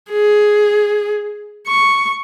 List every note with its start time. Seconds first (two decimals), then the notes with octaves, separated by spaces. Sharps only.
0.11 G#4
1.67 C#6